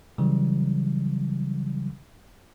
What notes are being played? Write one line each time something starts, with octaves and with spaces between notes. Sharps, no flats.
C#3 E3 F#3 G3